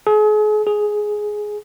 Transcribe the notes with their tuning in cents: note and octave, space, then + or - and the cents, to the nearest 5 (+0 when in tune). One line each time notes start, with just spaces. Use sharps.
G#4 +40
G#4 +10